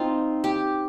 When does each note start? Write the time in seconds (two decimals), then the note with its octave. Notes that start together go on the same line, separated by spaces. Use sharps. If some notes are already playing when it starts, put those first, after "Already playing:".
Already playing: C4 D#4 F4
0.44 G4